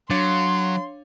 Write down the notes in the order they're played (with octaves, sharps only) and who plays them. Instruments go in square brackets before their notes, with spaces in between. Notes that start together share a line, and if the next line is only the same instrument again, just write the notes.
[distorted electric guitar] F#3 [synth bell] D4 C#5 F5 [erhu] C6